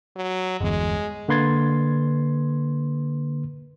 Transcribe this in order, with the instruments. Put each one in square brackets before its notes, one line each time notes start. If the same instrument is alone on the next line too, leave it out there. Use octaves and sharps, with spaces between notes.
[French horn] F#3
[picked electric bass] G1 E2 [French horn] G#3
[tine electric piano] D3 A#3 B4 C6 G#6 A6